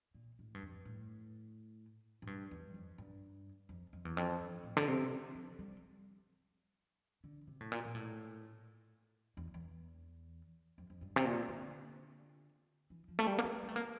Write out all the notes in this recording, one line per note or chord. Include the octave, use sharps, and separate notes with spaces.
A#2
A2
G2
F2
A2
A2
G2
E2
F2
G2
F2
F2
E2
F2
G2
A2
D3
C3
E3
F3
G3
D3
C3
A2
A#2
A#2
A2
E2
E2
F2
F2
G2
C3
A#2
D3
E3
F3
A3
G3
A#3
A3
A#3
A3
A#3